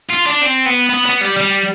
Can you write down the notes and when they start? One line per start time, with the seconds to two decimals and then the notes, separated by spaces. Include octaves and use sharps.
0.10 F4
0.26 D4
0.42 C4
0.66 B3
0.89 B3
1.06 B3
1.21 G3
1.37 G3